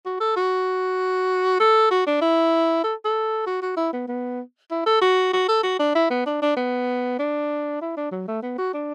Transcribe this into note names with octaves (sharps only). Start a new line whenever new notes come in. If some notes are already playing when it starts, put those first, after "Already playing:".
F#4
A4
F#4
A4
F#4
D4
E4
A4
A4
F#4
F#4
E4
B3
B3
E4
A4
F#4
F#4
A4
F#4
D4
E4
B3
D4
D4
B3
D4
E4
D4
F#3
A3
B3
F#4
D4